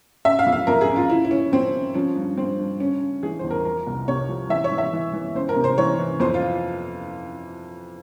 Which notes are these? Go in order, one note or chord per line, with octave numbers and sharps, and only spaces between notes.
C#3 E5
F5
F2
F5
F2 A#4
G#4
C#3
F4
C#3 E4
E4
C#3 C#4
F3 C4
C#3
F3 C#4
G2
G2 C4
G2
C#3 C#4
C#3
E3 G#4
E2 C5
A#4
F3 A#4
C2
C3 C#5
F3
E3 E5
C#5
E3
E5
E3
E3
C#2 C5
A#4
C3
C5
E3 C#5
E3
F2 C5
F4